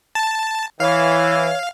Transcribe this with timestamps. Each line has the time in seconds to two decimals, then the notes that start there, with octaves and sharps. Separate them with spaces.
0.15 A5
0.80 E3 C#5 F5